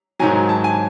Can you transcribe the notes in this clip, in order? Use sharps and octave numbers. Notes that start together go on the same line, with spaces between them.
G#2 D#3 F#3 G#5
A5
G#5